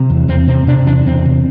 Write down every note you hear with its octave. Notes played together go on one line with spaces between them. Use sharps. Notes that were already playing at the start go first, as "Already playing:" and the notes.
Already playing: C3
E2
E2 C4
C3 C4
C3 D4
E2 D4
E2 C4
C3